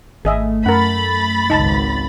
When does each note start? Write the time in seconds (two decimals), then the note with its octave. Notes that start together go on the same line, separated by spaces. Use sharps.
0.25 G#1 A3 G#4 D#5 E5
0.66 F#2 A#4 F#5 B5 A6
1.50 G#1 C#2 D#4 A5